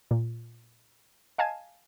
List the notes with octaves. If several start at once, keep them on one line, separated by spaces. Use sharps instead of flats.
A#2
D#5 F5 G#5 A5 G#6